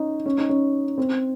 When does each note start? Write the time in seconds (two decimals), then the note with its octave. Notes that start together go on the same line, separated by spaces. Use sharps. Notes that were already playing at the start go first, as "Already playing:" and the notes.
Already playing: C#4 D#4
0.26 C#4
0.38 D#4
0.49 C#4
0.98 C4